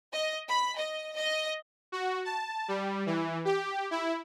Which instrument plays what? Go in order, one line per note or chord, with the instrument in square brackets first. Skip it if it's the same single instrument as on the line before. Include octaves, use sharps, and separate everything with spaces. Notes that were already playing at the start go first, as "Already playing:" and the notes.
[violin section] D#5
B5
D#5
D#5
[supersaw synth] F#4
A5
G3
E3
G4
E4